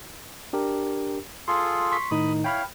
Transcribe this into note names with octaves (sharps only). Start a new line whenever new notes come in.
D4 G4 A#4
F4 G#4 A4 C6
C6 C#6 B6
A2 D#3 D#4 B5 D#6
E4 C#5 F5 G5 B5 F6